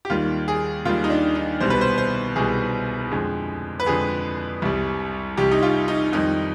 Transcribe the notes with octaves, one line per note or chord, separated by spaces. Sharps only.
G4
D#2 D#3 G3 F4
G#4
D#2 D#3 G3 F4
D#4
D4
D#4
C2 B2 G3 C5
B4
C5
C5
C2 B2 G3 G#4
F2 D3 G#3
B4
F2 D3 G#3 G#4
C2 C3 G3
C2 C3 G3 G4
D#4
F4
D#4
F2 D#3 G3 D#4